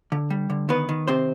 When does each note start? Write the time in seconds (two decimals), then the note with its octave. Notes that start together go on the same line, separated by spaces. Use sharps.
0.12 D3
0.30 G3
0.50 D3
0.69 D#3 B3 B4
0.89 D#3
1.07 C3 C4 C5